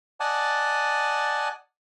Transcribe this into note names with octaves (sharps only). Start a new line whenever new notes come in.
D5 D#5 F#5 G#5 A5